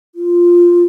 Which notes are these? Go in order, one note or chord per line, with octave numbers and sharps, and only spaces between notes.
F4